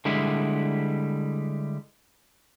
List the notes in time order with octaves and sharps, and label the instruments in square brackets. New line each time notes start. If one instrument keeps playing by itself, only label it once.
[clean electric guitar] D3 G3 G#3 E4